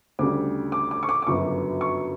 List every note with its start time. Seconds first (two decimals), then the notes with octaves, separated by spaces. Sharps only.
0.19 D2 C#3 G3 D6
0.72 D6
0.91 D6
1.03 C#6
1.09 D6
1.22 D6
1.27 G1 F#2 C#3 C#6
1.81 C#6